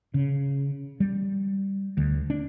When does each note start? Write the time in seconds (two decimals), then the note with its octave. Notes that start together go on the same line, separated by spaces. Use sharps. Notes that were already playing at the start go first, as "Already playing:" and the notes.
0.14 C#3
1.00 G3
1.97 D2
2.30 D4